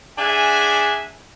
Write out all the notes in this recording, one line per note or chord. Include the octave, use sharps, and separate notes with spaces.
D4 G#4 E5 F#5 G#5